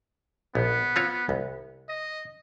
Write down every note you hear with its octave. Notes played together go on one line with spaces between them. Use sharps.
A#1 B3
C4 F4 C#5
C2
D#5